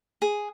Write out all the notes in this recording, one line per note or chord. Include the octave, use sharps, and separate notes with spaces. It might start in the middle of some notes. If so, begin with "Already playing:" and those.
G#4